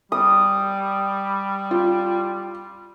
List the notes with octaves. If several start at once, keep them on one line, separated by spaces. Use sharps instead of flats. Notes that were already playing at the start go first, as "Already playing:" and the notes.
G3 D#6
F4